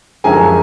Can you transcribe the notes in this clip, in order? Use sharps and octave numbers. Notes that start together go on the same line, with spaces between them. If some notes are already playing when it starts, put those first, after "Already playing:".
F#2 D3 F3 G#3 G#5 A#5